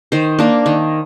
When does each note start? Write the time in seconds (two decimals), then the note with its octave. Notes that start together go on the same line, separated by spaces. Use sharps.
0.12 D#3 C5
0.39 A#3 D4
0.66 D#3